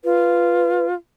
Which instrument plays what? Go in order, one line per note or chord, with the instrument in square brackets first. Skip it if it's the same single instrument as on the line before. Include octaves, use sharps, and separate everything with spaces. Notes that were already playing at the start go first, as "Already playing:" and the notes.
[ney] F4 [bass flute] B4